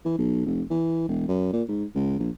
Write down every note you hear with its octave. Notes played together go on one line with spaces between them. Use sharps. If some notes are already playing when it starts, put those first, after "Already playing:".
E3
B1
F1
E3
E1
F#2
A#2
G#2
C#2
A#1